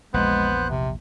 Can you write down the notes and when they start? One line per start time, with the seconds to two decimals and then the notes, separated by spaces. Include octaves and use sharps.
0.14 A#1 E2 G#3 B3 C5 F#6
0.68 C3